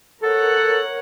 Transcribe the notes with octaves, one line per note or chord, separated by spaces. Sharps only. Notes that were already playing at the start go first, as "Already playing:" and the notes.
A4 A#4 C#5 F#5